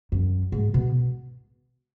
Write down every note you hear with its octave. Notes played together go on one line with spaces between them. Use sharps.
F#2
G#2
B2